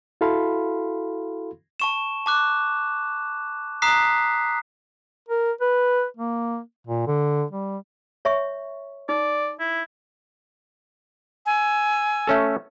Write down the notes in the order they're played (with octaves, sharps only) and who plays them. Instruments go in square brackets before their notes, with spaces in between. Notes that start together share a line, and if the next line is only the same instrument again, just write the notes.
[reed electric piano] E4 F#4 A4 F5 B5 C6
[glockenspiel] A5 C#6 E7
A5 D6 F#6
A#5 D#6 F#6 B6 C7
[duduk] A#4
B4
A#3
A#2
D3
G3
[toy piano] C#5 E5 C#6
[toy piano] D#4 [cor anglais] D5
[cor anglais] E4
[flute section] G#5 E6
[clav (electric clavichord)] A3 C#4 A4